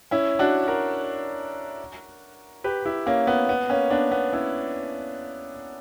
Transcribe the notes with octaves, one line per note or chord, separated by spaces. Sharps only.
C#4 E4
D4 F#4
F#4 A#4
G4 B4
E4 G4
A#3 C#4
B3
B3
A#3 C#4
B3 D4
B3
C#4 E4